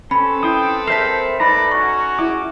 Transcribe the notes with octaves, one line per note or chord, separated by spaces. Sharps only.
C4 C#4 A4 B4 B5
E4 G5 C6 D#6
G#4 A#4 C5 E5 A5 B6 C7
A3 D#4 A4 B4 D5 A#5 B5
C#4 F#4 C#6
E4 G#4 G#5 D6